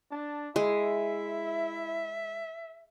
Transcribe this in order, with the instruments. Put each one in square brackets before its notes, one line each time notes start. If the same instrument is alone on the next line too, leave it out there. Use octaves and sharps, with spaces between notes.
[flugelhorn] D4 [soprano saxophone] A5
[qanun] G#3 [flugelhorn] E4 [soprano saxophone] E5